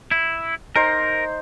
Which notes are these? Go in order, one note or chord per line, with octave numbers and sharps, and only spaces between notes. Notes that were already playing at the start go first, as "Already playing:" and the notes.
E4
D#4 A#4 C5 A#5